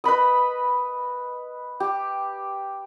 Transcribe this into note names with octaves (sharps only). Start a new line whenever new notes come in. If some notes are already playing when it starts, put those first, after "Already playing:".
B4 D#5 B5 D#6
G4